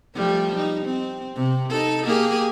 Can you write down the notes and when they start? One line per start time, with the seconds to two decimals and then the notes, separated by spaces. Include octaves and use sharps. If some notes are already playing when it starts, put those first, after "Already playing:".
0.15 F3 G3 A3
0.56 D#4
0.86 C4
1.35 C3
1.69 D#4 A4
2.05 A#3 G4 G#4